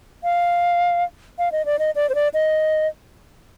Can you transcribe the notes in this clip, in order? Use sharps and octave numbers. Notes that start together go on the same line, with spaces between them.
F5
F5
D#5
D5
D#5
D5
C5
D5
D#5